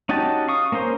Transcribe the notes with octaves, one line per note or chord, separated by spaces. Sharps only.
C#4 D#4 F#4 G4 A5
F5 C#6 D#6
A#3 C#4 A#4 C5